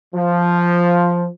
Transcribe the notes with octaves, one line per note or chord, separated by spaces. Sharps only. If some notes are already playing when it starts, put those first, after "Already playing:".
F3